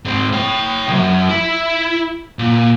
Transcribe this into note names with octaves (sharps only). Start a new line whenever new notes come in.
G#2 C4
C#5 G5
B1 F#2
E4
A#2